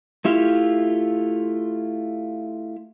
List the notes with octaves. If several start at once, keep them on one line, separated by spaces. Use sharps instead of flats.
A3 E4 F4 G4